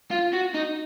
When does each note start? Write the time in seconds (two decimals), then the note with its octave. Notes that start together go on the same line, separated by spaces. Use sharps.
0.11 F4
0.33 F#4
0.54 D#4